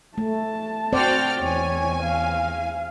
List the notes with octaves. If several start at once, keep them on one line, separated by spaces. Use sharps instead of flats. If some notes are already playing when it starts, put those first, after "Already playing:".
A3 A5
C4 F#4 C5 D5 G5 F6
E2 C#5 G#5
F5